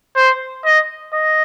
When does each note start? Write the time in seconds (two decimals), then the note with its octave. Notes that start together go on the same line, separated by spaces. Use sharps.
0.16 C5
0.65 D#5
1.13 D#5